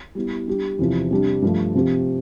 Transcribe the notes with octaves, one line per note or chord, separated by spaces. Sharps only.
G3 B3 E4
G3 D4 G4
E2 C3 F3
C3 G3 D4
G2 F3 A3
C3 F3 C4 G4